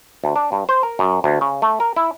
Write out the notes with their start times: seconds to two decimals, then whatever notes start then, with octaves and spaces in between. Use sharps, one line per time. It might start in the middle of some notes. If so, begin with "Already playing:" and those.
0.24 D2
0.36 D4
0.52 G2
0.69 C5
0.83 A#4
0.99 F#2
1.24 D2
1.41 C#3
1.62 A3
1.80 A#4
1.96 E4